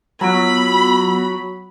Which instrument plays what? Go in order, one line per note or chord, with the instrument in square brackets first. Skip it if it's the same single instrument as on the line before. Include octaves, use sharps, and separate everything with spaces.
[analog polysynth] F#3 [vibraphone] B3 F4 E6 [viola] B5